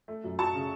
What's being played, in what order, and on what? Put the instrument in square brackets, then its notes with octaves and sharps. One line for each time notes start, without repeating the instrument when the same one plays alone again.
[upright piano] A3
F#2
F#3 A5 C#6
C#3